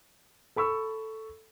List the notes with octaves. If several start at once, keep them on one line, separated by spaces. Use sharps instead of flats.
A4 B5 C#6 E6